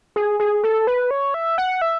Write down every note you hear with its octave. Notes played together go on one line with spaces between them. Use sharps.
G#4
G#4
A4
B4
C#5
E5
F#5
E5